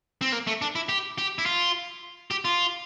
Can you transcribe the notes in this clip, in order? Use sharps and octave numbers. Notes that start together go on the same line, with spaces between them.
C4
A#3
A3
D4
E4
G4
G4
E4
F4
G4
F4